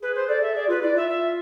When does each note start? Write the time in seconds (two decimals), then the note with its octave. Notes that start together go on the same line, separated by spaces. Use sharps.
0.02 G#4 B4
0.15 C5
0.28 A4 D5
0.42 E5
0.55 G#4 D5
0.68 F4 B4
0.82 E4 D5
0.95 F4 E5
1.08 E5